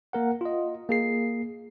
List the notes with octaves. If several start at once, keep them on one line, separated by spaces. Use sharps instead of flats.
A#3 A#4 F#5
F4 D#5
A#3 G#4 C7